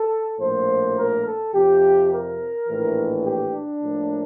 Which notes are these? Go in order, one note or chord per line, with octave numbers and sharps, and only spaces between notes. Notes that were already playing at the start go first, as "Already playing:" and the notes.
Already playing: A4
A#1 A2 F3 A#3 C5
A#4
A4
F2 C3 F3 G4
A#4
A#1 A2 E3
G4
D4
A2 F3 A#3